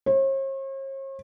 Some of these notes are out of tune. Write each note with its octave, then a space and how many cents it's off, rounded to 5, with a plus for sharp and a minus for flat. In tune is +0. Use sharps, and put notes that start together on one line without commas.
C#5 -45